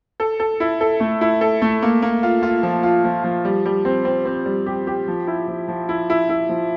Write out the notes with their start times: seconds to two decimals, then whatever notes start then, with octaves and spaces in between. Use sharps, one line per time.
0.20 A4
0.40 A4
0.60 E4
0.81 A4
1.00 A3
1.21 E4
1.41 A4
1.62 A3
1.82 A#3
2.02 A#3
2.23 F4
2.43 F4
2.63 F3
2.83 F4
3.04 F3
3.24 F3
3.45 G3
3.65 G3
3.85 C4
4.05 C4
4.26 C4
4.46 G3
4.66 G4
4.87 G4
5.08 F3
5.27 E4
5.48 F3
5.68 F3
5.89 E4
6.10 E4
6.29 E4
6.49 F3